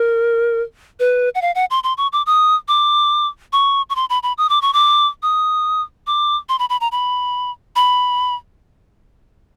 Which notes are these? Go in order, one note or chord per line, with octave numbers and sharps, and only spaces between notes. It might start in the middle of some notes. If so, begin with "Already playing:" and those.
Already playing: A#4
B4
F#5
F5
F#5
C6
C6
C#6
D6
D#6
D6
C#6
C#6
C6
B5
B5
D#6
D6
C#6
D6
D#6
D6
C6
B5
B5
A#5
B5
B5